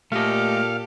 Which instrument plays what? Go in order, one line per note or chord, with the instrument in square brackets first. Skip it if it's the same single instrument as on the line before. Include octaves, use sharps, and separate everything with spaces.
[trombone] A#2 [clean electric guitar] A3 D#5 [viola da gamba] G4 A4 [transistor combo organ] F5